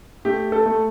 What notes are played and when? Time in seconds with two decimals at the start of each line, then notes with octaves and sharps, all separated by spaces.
0.25 A3 G4
0.52 A4
0.66 A3